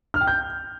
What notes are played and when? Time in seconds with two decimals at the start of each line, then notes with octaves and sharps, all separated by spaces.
0.14 F6
0.21 G5
0.27 G6